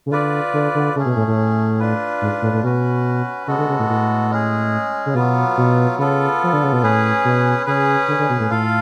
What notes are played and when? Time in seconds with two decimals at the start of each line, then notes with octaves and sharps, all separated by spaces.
0.06 C#3
0.11 D3 F4 B4 D5
0.53 D3
0.75 D3
0.96 C#3 A3 C#4 G#4
1.05 B2
1.16 A2
1.27 A2
1.80 D4 F4 B4
2.22 G#2
2.42 A2
2.53 A2
2.63 B2 C#4 F#4 B4
3.47 C#3 G#3 B3 F#4 A4
3.58 D3
3.69 C#3
3.79 A2
3.89 A2
4.31 G#3 C#4 G#4
5.06 C#3
5.15 B2 F#3 B3 F4
5.57 B2
5.98 C#3 B3 F4 A4
6.43 F3
6.53 D3
6.64 C#3
6.73 B2
6.83 A2 C#4 G#4 B4
7.25 B2
7.66 C#3 C#4 G#4 B4
8.08 D3
8.19 D3
8.30 B2
8.39 A2
8.50 A2 F4 A4 F5